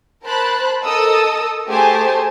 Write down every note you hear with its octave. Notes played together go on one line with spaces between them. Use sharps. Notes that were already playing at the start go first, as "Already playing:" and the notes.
A#4 C5 A5 B5 F#6
A4 A#4 D#5 D#6 E6
A3 G4 G#4 C5 G#5 A5